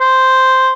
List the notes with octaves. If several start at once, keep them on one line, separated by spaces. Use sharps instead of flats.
C5